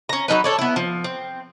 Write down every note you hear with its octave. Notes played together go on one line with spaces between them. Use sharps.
C#4 A#5
F#3 G3 D#4 B4
A4 C#5 D5
B3 E4
F3
C4